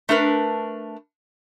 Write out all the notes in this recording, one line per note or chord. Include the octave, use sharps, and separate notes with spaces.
A3 D4 A#4 B4